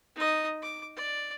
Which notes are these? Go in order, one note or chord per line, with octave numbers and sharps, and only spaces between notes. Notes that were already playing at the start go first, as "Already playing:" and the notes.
D#4 D#5
D6
D5